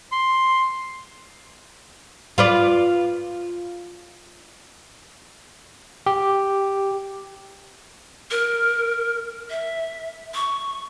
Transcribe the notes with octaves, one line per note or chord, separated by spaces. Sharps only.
C6
F4 B4 D5
G4
A#4
E5
C#6